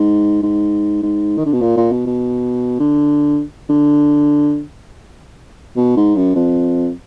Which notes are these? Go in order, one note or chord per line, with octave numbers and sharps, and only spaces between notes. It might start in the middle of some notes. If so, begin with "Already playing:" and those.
Already playing: G#2
G#2
G#2
D#3
D3
B2
A#2
A#2
B2
B2
D3
D3
B2
G#2
F#2
F2